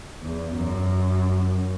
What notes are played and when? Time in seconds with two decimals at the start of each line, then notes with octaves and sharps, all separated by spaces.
0.22 E2
0.56 F#2